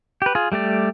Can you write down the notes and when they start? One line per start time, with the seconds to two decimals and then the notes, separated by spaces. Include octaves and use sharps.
0.22 G4 B4
0.35 F4 G#4
0.52 G3 A3 G4 D5